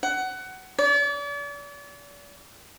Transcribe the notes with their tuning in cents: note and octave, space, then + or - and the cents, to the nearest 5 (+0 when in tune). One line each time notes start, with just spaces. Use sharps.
F#5 +20
D5 -40